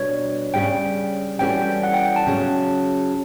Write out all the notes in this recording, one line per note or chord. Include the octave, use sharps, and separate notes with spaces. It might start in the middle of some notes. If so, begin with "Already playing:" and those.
Already playing: B2 G3 D4 C#5
C#3 G3 C#4 G5
E3 G3 C#4 F#4 A4 G5
F#5
G5
G5
A5
C#3 F#3 C#4